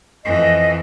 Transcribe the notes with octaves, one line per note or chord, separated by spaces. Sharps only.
F2 E3 D#5